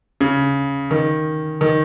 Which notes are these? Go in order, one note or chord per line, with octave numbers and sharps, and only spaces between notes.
C#3
D#3
D#3